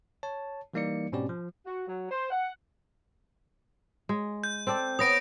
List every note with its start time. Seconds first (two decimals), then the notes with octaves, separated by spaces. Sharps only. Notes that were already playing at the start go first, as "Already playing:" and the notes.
0.23 C#5 A5
0.74 E3 G3 A#3 D#4 D5 C#7
1.12 G#2 B2 C4 C#4 G4 D5
1.29 F3
1.65 F#4
1.87 F#3
2.09 C5
2.30 F#5
4.09 G#3
4.44 G6
4.67 C4 A4 D5
4.99 B3 C#5 D#6 A#6 D7